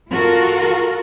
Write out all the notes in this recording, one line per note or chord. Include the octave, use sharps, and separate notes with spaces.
F4 F#4 A4 A#4